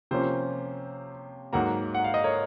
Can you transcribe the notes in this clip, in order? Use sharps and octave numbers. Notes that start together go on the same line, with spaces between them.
C3 F3 A#3 C#4 C5
G#2 F#3 A#3 F#5 A#5
F#5
F5
D#5
A#4 C#5